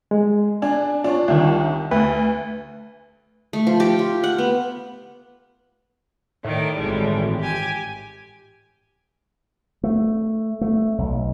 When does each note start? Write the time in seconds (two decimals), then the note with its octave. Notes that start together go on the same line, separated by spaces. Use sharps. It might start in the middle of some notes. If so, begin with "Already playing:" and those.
0.11 G#3
0.62 D4 G#5
1.04 D4 F4 C#5
1.28 C2 D#3
1.91 D2 B4
3.53 A3
3.67 F3
3.80 G4
3.99 F4
4.24 F#5
4.38 B3
6.44 A2 D#3 D5
6.77 G#1 E3 G3 G#3
7.40 G4 G#5
9.84 A3
10.61 A3
10.98 B1